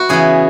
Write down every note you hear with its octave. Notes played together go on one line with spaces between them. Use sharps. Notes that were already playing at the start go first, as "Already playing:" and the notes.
Already playing: F#4 B4
C#3 E3 B3 G#4